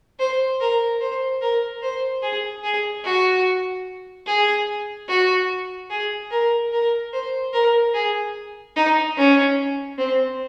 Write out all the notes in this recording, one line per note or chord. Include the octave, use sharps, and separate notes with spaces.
C5
A#4
C5
A#4
C5
G#4
G#4
F#4
G#4
F#4
G#4
A#4
A#4
C5
A#4
G#4
D#4
C#4
C4